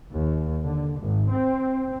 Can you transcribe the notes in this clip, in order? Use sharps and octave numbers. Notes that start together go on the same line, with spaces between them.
D#2
D3
G#1
C4